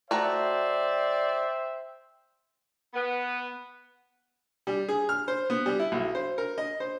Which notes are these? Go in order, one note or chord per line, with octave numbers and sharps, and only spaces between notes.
A3 F#4 C5 D5 E5 G5 A#5
B3
G3
G#4
F6
C5
B3
G3
E4
B1
C5
A#4
D#5
C5